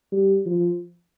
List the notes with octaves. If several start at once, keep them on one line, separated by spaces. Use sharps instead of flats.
G3
F3